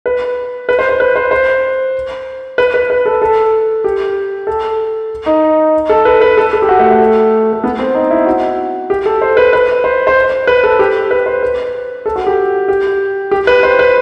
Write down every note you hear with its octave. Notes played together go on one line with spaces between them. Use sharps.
B4
B4
C5
C5
B4
C5
C5
B4
B4
B4
A4
A4
G4
A4
D#4
A4
B4
B4
A4
A4
G4
F#4
A3
A3
A3
B3
C4
D#4
E4
F#4
G4
A4
C5
B4
B4
C5
C5
B4
A4
G4
B4
C5
B4
A4
F#4
G4
G4
G4
B4
C5
B4